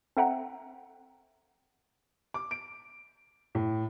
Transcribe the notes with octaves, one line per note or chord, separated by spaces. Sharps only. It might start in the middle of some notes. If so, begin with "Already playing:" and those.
C4 A4 E5 F#5 G5 A#5
D6
D7
A2